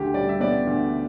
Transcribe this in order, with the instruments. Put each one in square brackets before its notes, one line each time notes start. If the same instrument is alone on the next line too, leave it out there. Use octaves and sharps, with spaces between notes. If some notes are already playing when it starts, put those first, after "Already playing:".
Already playing: [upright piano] D2 G4
G3 D5
E5
B3 D5
D2